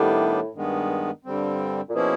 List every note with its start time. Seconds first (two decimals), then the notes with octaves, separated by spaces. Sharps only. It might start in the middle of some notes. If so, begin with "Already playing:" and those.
Already playing: A2 D#3 G3 B3 D4 G4
0.54 G2 D#3 G#3 B3
1.25 G2 D3 G3 C4
1.89 A#2
1.95 B2 F3 A#3 C#4 E4 G#4